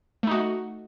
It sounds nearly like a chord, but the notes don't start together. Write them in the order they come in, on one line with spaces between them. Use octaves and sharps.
A3 D#4 F#4